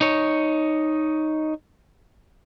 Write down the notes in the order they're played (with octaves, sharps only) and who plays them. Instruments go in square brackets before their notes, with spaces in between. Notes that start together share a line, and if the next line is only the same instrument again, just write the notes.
[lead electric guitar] D#4 C#5